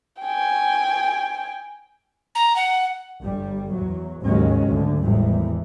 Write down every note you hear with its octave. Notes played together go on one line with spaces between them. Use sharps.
G5 G#5
A#5
F#5
G1 G3
E2 F#3
D#2 G#2 C#3 F#3 G#3 C#4
D2 D3
G#1 E2 A2 E3 G3